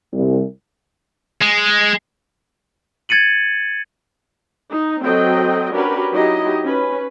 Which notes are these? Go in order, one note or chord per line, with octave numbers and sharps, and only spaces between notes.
C2
G#3
G#6 A6 C#7 D#7 F#7
D#4
F#3 C4 A4 D#5 G5
C#4 D4 F#4 G4 A#4 B4
F#3 D#4 E4 G4 D#5
C#4 B4